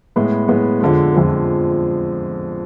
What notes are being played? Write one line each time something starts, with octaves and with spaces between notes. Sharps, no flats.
A2 G#3 B3
A2 G#3 B3
F2 D3 F3 G#3
F2 D3 F3 G#3